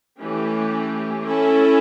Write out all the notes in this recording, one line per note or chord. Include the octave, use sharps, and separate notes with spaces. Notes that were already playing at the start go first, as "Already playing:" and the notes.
E3 A3 C#4 G4
C#4 E4 A4